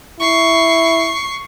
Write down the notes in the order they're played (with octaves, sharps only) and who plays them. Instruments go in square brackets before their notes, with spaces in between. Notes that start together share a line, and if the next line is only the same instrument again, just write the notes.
[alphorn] E4 [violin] C#6 C7